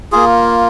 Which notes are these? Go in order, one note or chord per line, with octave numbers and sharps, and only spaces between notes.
A#3 F4 G#4